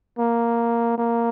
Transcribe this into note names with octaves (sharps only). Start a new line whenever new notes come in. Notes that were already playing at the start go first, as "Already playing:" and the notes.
A#3
A#3